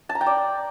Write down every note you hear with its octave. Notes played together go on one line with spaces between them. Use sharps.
A5
A#5
G5
D5